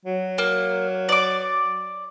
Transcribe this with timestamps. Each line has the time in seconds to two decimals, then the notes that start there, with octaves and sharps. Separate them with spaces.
0.05 F#3
0.38 A#3
1.09 D5 D6